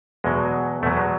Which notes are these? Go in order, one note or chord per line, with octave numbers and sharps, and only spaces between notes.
E2 B2 F#3 G#3
E2 B2 F#3 A3
G#3